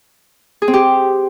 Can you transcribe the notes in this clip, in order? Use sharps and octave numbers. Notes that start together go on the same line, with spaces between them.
G#4
C4
G4